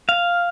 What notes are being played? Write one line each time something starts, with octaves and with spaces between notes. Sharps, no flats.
F5